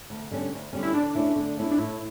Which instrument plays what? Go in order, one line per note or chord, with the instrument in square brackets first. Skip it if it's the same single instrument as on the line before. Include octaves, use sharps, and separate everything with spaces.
[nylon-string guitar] D2
D3 G3 C#4
D2
D3 G3 C#4
[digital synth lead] E4
[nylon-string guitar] D3 [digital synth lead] D4
[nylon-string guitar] A3 C#4 E4
D3
A3 C#4 E4
[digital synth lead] D4
[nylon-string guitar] A2 [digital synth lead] E4